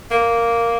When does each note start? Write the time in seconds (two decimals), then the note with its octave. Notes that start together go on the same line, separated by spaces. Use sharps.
0.11 A#3